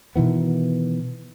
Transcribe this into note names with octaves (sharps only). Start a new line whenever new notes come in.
B2 D#3 E3 B3